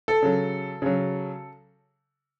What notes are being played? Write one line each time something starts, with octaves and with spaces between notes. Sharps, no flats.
A4
C#3 F#3
C#3 F#3